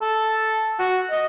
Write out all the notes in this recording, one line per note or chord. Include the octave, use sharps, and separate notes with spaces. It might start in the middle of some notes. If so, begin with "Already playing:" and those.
A4
F#4
D#5